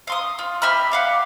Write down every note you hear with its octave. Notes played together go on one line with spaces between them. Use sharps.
F5 C6 D#6
F4
G4 E5 B5 F6
G4 F5 F#5